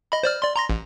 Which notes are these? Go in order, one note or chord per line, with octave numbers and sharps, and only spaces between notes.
D#5 B5
C5 D5 F6
D5 C6
A#5 C6 A#6
A1